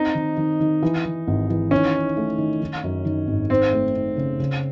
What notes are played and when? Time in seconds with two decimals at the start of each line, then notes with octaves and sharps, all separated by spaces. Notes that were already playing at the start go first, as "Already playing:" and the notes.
Already playing: C4 D#4
0.15 D#3
0.37 D#3
0.60 D#3
0.83 E3
1.05 E3
1.27 G#1
1.50 E3
1.71 D#3 C#4
1.94 D#4
2.17 A3
2.38 D#3
2.62 D#3
2.84 F#2
3.05 D#3
3.27 G#1
3.50 C4 D#4
3.73 A3
3.96 D#4
4.17 C#3
4.39 C#3